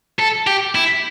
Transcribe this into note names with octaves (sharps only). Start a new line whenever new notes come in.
A4
G4
E4